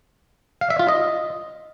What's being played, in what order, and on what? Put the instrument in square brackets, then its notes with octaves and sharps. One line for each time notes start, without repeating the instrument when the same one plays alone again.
[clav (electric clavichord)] F5
E5
F4
D#5